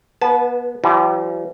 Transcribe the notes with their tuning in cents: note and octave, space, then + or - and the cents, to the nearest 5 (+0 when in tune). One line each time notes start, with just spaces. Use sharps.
B3 -30 B4 +0 A5 -25
E3 +45 G3 -40 F#4 +0